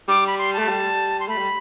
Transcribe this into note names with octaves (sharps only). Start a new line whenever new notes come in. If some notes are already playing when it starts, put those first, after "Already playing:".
G3 D6
B5
C6
A5
A3
G3
C6
A3 B5
G3